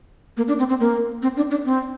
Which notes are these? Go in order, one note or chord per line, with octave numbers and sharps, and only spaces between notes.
A#3
D4
C4
C4
A#3
C4
D4
D4
C4